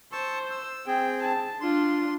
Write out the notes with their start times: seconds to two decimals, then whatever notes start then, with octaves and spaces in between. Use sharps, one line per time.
0.12 C5 A5 C#6 E6
0.51 E6
0.87 C4 G#4 G5
1.23 A5
1.61 D4 F4 C6